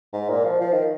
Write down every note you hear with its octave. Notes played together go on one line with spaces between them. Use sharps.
G#2
A#2
F3
F3
D#3